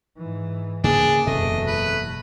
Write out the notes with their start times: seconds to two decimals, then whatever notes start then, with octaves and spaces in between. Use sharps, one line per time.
0.17 G#2 E3
0.84 C#3 A#3 B3 D4 G#4
1.27 F#1 E2 B2 A3 D#5
1.67 B4